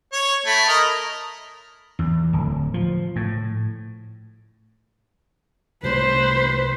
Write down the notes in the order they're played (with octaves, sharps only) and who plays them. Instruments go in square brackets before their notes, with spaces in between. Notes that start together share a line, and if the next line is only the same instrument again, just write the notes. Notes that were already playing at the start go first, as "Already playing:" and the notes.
[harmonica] C#5
A3 E4
A#4 D#5 A#5
[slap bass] E2
D1
F3
A2
[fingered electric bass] C2 C3 A3 [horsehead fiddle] B4 C5